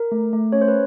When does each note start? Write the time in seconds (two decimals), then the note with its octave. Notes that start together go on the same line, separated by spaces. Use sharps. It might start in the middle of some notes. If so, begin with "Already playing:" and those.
Already playing: A#4
0.12 A3
0.33 A3
0.52 C#4 C#5
0.61 C5
0.68 B4